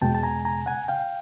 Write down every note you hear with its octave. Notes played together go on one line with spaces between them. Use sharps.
E2 B2 G#3 G5 A5
A5
G#5 A#5
G#5 A#5
F#5 G#5
F5 G5